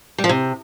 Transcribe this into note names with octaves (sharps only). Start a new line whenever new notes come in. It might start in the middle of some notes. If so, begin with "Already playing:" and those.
G3
F3
C3